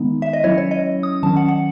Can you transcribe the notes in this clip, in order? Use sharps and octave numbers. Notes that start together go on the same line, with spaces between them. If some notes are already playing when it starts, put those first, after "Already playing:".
Already playing: D#3 G#3 B3 D#4
E5
D#5
F#3 C#4 E4 C#5
C#5
D#5
D#6
D#3 F#3 C#4 A5
F#5
F#5